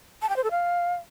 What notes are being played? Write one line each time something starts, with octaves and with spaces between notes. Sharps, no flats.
A5
G5
C5
A4
F5